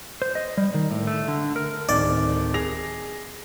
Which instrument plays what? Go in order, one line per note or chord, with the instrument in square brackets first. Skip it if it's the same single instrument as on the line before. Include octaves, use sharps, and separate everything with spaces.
[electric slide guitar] C5
D#5
G3
D#3
A2
A3
D3
A#4
[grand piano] D1 D#3 [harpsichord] D5
[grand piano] G#4 A#6 F7